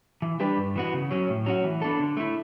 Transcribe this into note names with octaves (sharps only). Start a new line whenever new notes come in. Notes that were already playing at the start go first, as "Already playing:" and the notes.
E3
G3 D4 G4 B4
G2
E3 B3 F#4
C#3
F#3 C#4
A2
F#3 C#4 F#4
E3
B3 D4 A4
D3
A3 E4